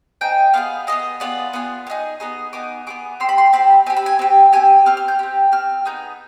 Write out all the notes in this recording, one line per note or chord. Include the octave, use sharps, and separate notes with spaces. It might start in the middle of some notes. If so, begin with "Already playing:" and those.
C4 D#4 G#4 G5
B3 F4 G#4 F5
B3 F4 G#4 D#5
B3 F4 G#4 D5
B3 F4 G#4
B3
D#4 G#4
B3 D#4 G#4 D#5
B3 D#4 G#4 D6
B3 D#4 G#4 D6
C4 G4 C6
B5
C6
C4 G4 B5
C4 G4 G#5
B5
G#5
C4 G4
C4 G4 G#5
C4 G4 F6
F6
G6
C4 G4
C4 G4 F6
B3 D#4 G#4 G6